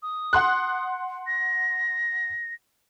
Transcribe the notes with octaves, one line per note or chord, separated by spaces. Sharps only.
D#6
F#5 C6 F#6
A#6